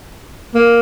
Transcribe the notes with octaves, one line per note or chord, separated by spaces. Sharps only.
A#3